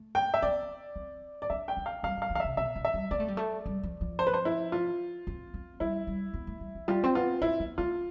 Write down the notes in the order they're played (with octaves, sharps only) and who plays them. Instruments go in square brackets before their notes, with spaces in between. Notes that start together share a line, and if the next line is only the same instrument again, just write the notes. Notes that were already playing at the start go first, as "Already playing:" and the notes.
Already playing: [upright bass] A3
[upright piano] G5
E5
[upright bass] B3 [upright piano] D5
[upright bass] C4
[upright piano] D5
[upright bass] D4 [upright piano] E5
[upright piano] G5
[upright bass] D4
[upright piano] F5
[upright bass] G3 [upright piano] F5
[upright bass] G3
[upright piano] F5
[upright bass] E3
[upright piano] F5
[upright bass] C3 [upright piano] E5
[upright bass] B2 [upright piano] E5
[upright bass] E3
[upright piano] E5
[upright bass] G3
[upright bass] B3 [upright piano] D5
[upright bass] A3
G3
A3
G3
F3
F3
[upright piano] C5
B4
C5
E4
F4
[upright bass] C4
C4
[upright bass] G3 [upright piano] E4
[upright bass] G3
B3
A3
G3
F3
[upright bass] G3 [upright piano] F4
[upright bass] C4
[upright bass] B3 [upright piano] F4
[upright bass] C4 [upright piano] E4
[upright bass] B3
[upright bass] A3 [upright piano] F4